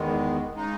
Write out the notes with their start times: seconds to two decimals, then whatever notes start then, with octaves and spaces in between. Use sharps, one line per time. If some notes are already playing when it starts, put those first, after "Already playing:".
Already playing: E2 D#3 G#3 B3
0.54 C#3 G#3 D#4